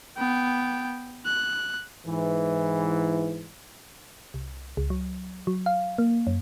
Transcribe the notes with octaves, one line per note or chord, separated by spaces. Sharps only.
B3 G5
F#6
G#2 E3
C2
C#2
F#3
F#3
F5
A#3
F#2